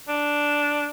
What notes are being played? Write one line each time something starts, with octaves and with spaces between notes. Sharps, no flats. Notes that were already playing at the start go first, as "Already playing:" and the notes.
D4